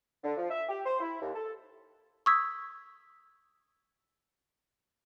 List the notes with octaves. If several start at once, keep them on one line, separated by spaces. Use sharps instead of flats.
D3
F3
E5
G4
C5
E4
D#2
A4
C#6 D#6 E6 G#6 B6